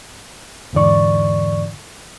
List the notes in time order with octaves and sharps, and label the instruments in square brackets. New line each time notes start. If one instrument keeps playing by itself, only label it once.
[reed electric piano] E2 G#2 D3 E3 D5 C#6